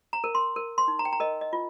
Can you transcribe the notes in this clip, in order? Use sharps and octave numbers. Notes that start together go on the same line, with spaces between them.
A#5
A#4
C6
A#4
C6
D#4
A#5
G5
A#5
A#4 D#5
D#5
F4